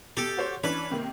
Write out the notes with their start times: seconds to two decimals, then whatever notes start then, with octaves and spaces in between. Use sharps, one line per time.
0.17 B2 G4 A4
0.37 F#4 C5 C#5
0.64 E3 C#4 D4 B4
0.90 C3 D#3 A#3